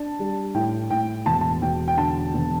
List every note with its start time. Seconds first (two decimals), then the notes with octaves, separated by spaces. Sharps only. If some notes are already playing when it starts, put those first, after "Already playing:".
Already playing: D4 A5
0.19 G3
0.54 A2 G5
0.90 A2 G5
1.25 E1 A5
1.41 A5
1.62 E1 G5
1.88 G5
1.97 D3 A5
2.34 E1